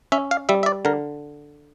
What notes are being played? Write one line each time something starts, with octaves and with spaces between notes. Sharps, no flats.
C#4 E5
F5
G3 E5
E5
D5
D3 A#4